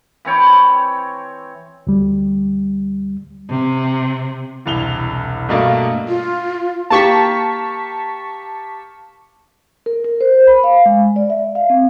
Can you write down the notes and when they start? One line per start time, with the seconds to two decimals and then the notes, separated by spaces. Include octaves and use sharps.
0.25 E3 C4 C#5 G5
1.87 D2 G3
3.50 C3
4.66 E1 C2 F7 G7
5.49 G2 B2 A3 A#3 D4
6.08 F4
6.90 A#3 G4 A5 C#6 B6
9.86 A#4
10.04 A#4
10.21 C5
10.47 B5
10.64 F5
10.86 G#3
11.16 D5
11.30 E5
11.55 F5
11.70 C4